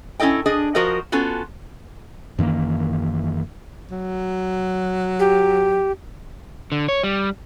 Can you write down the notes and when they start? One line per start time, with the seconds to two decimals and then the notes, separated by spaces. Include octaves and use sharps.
0.20 C#4 E4 A4 D#5 G5
0.46 D4 G#4 D#5
0.75 F3 F#4 A#4 C5 D#5
1.12 B3 C#4 F4 F#4 A4
2.39 F#2 D#3 E3 A#3
3.91 F#3
5.19 G4
6.72 D3
6.89 C#5
7.03 G3